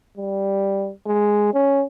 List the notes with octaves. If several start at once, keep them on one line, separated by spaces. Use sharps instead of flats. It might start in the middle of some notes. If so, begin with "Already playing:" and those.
G3
G#3
C#4